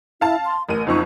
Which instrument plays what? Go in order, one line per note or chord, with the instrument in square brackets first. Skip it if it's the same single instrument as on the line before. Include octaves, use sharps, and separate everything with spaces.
[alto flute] E4 [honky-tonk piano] F5 A5
[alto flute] C6
[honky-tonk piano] A1 D#7 [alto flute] A#4
[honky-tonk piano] F#1 F2 C#6 [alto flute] D#4